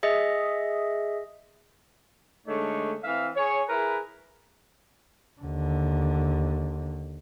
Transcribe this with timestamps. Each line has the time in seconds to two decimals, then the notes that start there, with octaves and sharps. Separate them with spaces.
0.03 G#4 D#5 E5
2.47 D3 G#3 A3 D#4 C#5
3.04 E3 C4 E5 F5
3.36 G#4 C#5
3.69 E4 G#4 A#4 B4
5.41 D#2 D3